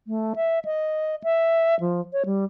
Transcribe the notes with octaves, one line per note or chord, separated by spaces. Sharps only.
A3
E5
D#5
E5
F3
C#5
G3